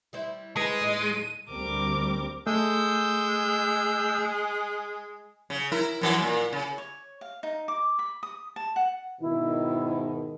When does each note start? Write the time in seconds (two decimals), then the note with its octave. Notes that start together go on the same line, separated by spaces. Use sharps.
0.13 G3 E4 C5
0.56 G#3 B4 C5 D#7
0.81 D#2 A2 D#5
1.50 D2 G3 C4 A#4 D6
2.47 G#3 A3 E6 G6
5.50 C#3
5.72 E4 A#4
6.01 F#2 E3 F#3
6.19 F#2 A#2
6.53 C#3
6.78 C#5
7.21 F5
7.43 D#4
7.68 D6
7.99 B5
8.23 D#6
8.56 A5
8.76 F#5
9.21 G#2 B2 D#3 E4